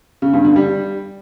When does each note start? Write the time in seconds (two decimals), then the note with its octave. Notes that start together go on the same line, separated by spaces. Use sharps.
0.22 C#3
0.33 G2
0.45 D3
0.56 G3